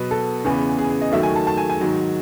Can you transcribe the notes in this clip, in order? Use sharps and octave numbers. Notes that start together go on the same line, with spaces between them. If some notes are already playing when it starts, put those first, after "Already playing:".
Already playing: B2 F#3 B3 B4
A4
E2 C#3 E3 B3
G#4
G#4
D#5
D#2 D#3 F#3 A3 E5
G#5
A5
A5
G#5
G#5
G#2 D#3 F#3